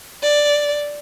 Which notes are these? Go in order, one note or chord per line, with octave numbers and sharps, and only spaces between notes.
D5